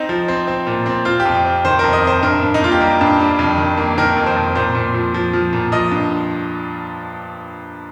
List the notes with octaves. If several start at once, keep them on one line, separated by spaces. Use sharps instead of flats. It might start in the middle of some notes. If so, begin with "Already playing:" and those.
Already playing: C4 D#4
F3
C4
C4
A#2
C4
C4 F4
G4
F2
G4
C4
D#3 C5
F2 A#4
D#5
C3 C5
G2 A#4
G2
D#4
A#3 F4
G4
G3 A#4
G2
G3
F2
D#3
A#3
D#3 A#4
F2
C5
F2
A#2 C5
A#2
F3
F3
F3
A#2
F3 D#5
G2